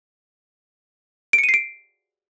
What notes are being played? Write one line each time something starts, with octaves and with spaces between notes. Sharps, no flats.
D7
C#7
D#7
C7
D7